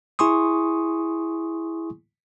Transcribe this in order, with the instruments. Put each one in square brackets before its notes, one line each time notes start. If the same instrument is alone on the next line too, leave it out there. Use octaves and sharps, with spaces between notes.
[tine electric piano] E4 G#4 G#5 C6 C#6 D#6